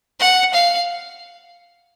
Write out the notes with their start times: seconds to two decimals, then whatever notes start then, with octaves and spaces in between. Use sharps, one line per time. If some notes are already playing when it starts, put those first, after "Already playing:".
0.20 F#5
0.54 F5